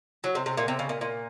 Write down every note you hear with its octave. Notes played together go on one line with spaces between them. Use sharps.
F#3
C3
C3
A#2
C3
C#3
A#2
A#2